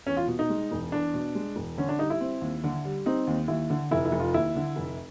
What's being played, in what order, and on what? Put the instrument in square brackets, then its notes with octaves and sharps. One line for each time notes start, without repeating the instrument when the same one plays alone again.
[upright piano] E2 [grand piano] C#4
[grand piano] F4
[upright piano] B2
[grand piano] D#4
[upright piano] G#3
E1
[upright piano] E2 [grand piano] D4
[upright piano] B2
G#3
E1
[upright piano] D3 [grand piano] C#4
[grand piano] D4
[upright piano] G3 [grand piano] D#4
[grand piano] E4
[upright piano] C4
D#2
D3
G3
[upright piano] C4 [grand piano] D#4
[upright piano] D#2
[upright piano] D#2 [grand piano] E4
[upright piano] D3
[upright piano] F1 [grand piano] E4
[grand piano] E4
[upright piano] F1
[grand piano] F4
[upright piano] D#2 [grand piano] E4
[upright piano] D3
F1